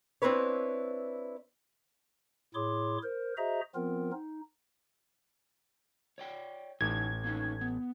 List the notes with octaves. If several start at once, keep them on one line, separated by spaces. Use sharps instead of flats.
C4 D4 E4 B4 C#5
A2 E4 G#4 C#5 C6 D6
A#4 C5
F#4 G#4 C5 D#5 E5 A#5
F3 B3 C4 F4 A#4
D#4
C#5 D5 G5
A1 A3 D#4 G#6
A#3 C#4 D#4
B3